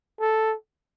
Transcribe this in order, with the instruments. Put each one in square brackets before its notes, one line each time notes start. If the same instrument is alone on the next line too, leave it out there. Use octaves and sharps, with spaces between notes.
[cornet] A4